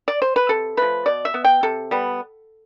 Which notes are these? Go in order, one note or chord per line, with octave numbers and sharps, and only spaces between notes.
D5
C5
B4
C3 A4
F3 A3 B4
B2 D5
E5
B3
G5
C3 A4
G3 B3